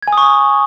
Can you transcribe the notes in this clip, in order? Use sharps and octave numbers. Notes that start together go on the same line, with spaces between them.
G#6
G#5
D#6
C#6
D#6